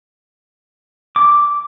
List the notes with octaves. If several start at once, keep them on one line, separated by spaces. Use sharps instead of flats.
D6